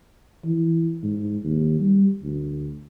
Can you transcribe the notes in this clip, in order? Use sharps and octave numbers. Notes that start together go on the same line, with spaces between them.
E3
G#2
D#2
G3
D2